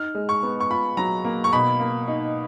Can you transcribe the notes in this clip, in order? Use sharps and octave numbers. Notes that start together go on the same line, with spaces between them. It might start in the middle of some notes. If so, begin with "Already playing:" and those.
Already playing: D#4 F6
G#3
C#6
B3
C#6
F4 B5
F#3 A#5
A#3
C#6
B2 B5
A#3
D#4